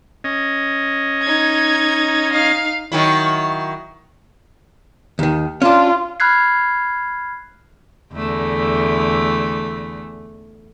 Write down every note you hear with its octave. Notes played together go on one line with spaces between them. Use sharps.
C#4 D#5
D#4 G#6
D#4 F5
D#3 F#3 E4
D#2 D#3
C#4 D4 F4
B5 F6 F#6 G#6 C7
E2 D3 A3